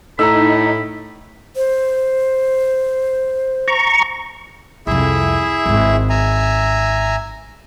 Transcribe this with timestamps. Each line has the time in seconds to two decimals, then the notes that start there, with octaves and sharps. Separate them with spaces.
0.19 A2 D#4 A#5 B5 E6
1.56 C5
3.68 A#5 C#6
4.87 C2 F2 E4 G#4 E5
5.66 G#1 G#2
6.10 E5 G#5 A#5